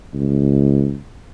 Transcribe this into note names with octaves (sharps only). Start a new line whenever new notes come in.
C#2